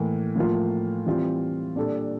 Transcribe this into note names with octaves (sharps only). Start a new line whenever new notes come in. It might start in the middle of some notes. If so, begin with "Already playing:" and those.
Already playing: A2 E3 A#3
A2 F3 A#3 F4
E3 G3 C4 F4
A#2 G3 D4 A4